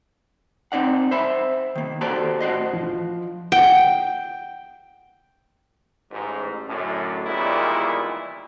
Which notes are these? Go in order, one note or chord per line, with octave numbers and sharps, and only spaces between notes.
C4 D#4 D5 F#5
C5 E5 B5
D#3 A#3
F#4 G4 A4 C5 D5
A2 F#4 C5 D#5
F3
F#5 G5
A1 G#2
F#2 A2 D3
E2 A#2 D#3 G3 G#3 E4